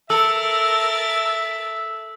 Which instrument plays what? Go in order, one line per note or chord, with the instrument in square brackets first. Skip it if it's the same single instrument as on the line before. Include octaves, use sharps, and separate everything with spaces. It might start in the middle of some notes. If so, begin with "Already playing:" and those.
[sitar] A4 [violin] A#4 A6 [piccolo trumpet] E5 [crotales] E6